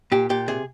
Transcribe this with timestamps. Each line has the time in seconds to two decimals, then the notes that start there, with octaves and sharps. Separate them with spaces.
0.12 A#2 G4
0.30 A#2 G4
0.48 C3 G#4